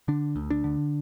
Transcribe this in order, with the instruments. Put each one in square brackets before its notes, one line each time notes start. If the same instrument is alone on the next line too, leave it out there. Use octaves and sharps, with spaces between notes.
[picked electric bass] D3 D4
D2
D4
D3